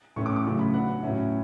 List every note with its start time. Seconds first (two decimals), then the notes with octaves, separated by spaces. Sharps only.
0.16 A2 E3 A3 C#4 C#6
0.26 D6
0.36 D6
0.45 C#3 F#3 A3 E4
0.59 B5
0.74 F#3 B3 D4 F#5
1.03 A2 F#3 C#4 E4